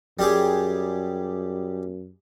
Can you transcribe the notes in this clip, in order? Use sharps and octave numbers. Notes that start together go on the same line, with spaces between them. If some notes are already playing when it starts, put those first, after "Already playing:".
F#2 G3 G4 G#4